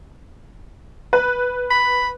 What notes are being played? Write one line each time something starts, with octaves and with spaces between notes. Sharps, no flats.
B4
B5